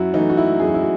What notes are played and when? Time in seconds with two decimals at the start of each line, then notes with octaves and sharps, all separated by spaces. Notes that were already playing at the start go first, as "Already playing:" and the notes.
Already playing: F#2 E4 F#4
0.14 E3 A3 D#4
0.30 F#4
0.37 E4
0.60 F#2 G#4
0.67 F#4
0.74 E4
0.82 F#4